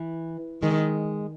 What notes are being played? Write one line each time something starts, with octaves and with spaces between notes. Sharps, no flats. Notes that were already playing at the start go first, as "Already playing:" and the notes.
Already playing: E3
D#3 G#3